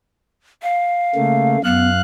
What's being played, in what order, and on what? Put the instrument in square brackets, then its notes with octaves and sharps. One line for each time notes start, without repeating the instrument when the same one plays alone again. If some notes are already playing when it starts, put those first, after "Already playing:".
[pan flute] F5
[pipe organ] C#3 A3 A#3
[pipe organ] F#2 F5 F#6 [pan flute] B3